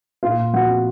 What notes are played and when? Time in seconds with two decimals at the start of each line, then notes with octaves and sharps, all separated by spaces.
0.23 A#2 F4 F5
0.38 A#2
0.53 F3 F#4 F#5
0.69 C4